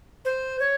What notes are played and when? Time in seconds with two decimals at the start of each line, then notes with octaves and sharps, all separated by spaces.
0.25 C5
0.60 C#5